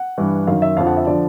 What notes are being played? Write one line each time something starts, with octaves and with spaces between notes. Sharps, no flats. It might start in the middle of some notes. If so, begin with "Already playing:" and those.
Already playing: F#5
G2 E3
F#2 D#3 F5
E5
F2 D3 F3 F5
F#5
E5
D3 F3 D5